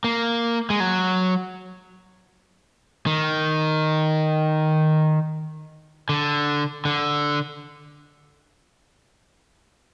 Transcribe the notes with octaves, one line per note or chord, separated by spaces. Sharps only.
A#3
G#3
F#3
D#3
D3
D3